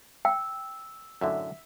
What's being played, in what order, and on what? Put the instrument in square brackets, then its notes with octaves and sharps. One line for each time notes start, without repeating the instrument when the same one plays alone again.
[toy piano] G5 [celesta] E6
[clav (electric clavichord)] F#2 A2 D3 [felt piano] E5